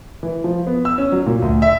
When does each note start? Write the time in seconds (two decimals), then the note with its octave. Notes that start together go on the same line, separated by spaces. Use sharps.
0.23 E3
0.44 F3
0.67 B3
0.85 E6
0.98 C#4
1.12 F#3
1.26 A#2
1.42 D2
1.62 E5